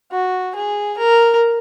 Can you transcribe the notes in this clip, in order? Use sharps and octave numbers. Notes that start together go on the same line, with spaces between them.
F#4
G#4
A#4